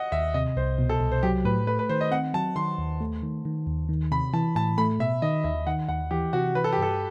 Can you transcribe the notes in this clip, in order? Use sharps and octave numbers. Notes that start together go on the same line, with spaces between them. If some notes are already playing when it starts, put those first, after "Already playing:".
Already playing: D#5 F#5
D#2 E5
C3 D#5
C2 C5
B2
A4
C2
C5
F#3 G4
A2 B4
A3 B4
B4
D#3 C5
D#5
C4 F#5
F#3 A5
D#3 C6
D#2
A3
D#3
D#3
D#2
D#3
C3 B5
E3 A5
A2 A5
A3 B5
B2 E5
D#3 D#5
D#2 E5
D#3 F#5
D#2 F#5
E3 G4
C3 F#4
E3 B4
A4
G4
G2 A4